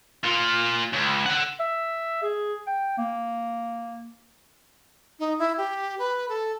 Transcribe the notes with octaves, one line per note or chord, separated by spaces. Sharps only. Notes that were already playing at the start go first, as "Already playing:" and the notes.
F4 A#4
C#2
A4 F#5
E5
G#4
G5
A#3
D#4
E4
G4
B4
A4